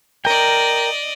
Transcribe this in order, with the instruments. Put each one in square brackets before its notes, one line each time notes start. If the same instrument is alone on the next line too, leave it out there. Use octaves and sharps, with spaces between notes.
[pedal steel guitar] A#4 G5 [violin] D5 D#5